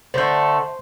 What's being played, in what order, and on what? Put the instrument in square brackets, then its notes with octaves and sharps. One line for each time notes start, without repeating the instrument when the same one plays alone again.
[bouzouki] D3 A3 [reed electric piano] C5 C6 G6